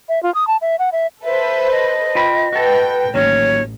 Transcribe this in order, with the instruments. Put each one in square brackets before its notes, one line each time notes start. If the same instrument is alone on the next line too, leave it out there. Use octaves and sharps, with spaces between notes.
[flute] E5
F4
D#6
A5
E5
F#5
E5
[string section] A4 B4 C5 [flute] E5
[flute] D#5
[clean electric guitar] F4 G5 B5
[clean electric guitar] F#4 A4 [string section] B4 G5
[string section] A1 [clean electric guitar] D#2 F#3 C#4 [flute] C#5